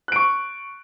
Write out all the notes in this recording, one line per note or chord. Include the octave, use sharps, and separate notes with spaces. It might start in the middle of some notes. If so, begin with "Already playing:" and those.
C#6 F#6 D7